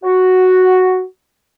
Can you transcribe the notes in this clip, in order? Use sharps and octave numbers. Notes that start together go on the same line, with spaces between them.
F#4